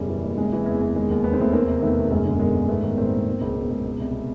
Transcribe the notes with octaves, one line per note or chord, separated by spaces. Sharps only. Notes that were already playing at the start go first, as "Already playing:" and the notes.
Already playing: E1 F#2 C#3 G3
E3
F#1
C3 G#3
E3
E2
E2
D#3 G#3
D#2
D#3 B3
C4
D#2 A3 B3
E2 A#3 C4
C3
D#3 A3 B3
E1
F#2 G#3 A#3
D3
G1 G#3 A#3
G1
G#2 A3 B3
D#3
A#1 A#3 C4
A#1
B2
C#2
B2
C#2
B2
C2
B2